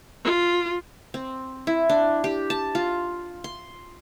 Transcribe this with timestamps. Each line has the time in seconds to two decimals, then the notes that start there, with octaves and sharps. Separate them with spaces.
0.24 F4
1.14 C4
1.67 E4
1.90 D4
2.24 G4
2.50 A5
2.75 F4
3.44 C6